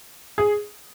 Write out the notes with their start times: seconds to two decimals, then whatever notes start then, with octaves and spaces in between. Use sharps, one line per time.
0.38 G#4